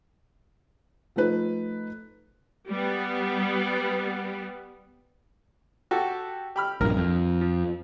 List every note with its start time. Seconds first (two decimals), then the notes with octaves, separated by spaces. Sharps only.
1.16 F3 A3 D#4 B4
2.69 G3 B3
5.91 F#4 G4 A4
6.56 G4 B5 F6
6.81 A#1 G2 A#4
6.97 F2
7.41 F3